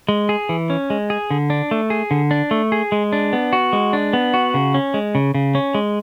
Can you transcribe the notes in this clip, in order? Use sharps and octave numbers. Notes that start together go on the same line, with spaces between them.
G#3
G#4
E3
C#4
G#3
G#4
D3
D4
A3
G#4
D3
D4
A3
G#4
G#3
D4
B3
F#4
G#3
D4
B3
F#4
C#3
C#4
G#3
C#3
C#3
C#4
G#3